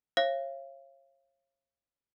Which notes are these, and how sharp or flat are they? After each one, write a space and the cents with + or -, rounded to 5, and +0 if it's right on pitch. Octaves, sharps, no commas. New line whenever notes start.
C#5 -35 F5 -35